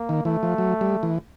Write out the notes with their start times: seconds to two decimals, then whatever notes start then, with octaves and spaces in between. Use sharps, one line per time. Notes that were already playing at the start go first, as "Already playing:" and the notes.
Already playing: A#3
0.09 D#3
0.25 E3 A3
0.43 F3
0.58 F#3
0.81 G3
1.03 E3